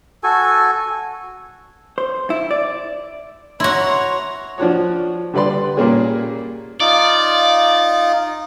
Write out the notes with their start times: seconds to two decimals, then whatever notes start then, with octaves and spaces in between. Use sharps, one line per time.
0.23 F#4 A4 G#5
1.98 C5
2.30 E4
2.51 D5
3.60 E4 F#4 C#5 A#5 C6
4.58 F3 D4 F#4 C#5
5.34 D3 G3 B4 D5 C6
5.77 A#2 G3 A#3 C#4 G#4
6.80 D#4 F4 D5